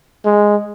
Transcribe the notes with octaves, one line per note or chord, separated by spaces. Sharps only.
G#3